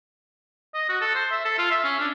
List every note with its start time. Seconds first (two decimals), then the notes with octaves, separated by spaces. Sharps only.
0.74 D#5
0.89 F#4
1.01 A4
1.15 C5
1.31 E5
1.45 A4
1.58 F4
1.71 E5
1.84 C#4
2.00 D4